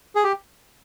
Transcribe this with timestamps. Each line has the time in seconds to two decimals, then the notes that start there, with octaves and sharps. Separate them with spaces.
0.15 G#4
0.24 G4